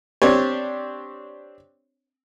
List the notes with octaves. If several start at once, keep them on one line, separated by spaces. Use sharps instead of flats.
C4 D4 G4 C#5